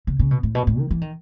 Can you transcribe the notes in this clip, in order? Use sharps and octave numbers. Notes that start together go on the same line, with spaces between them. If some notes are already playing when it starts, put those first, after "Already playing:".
C#3
C#3
B2
A2
B2
A2
D#3
E3
D#3